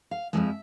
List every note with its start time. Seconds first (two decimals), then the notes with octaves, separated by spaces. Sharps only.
0.11 F5
0.33 F2 C#3 F3 G#3 E5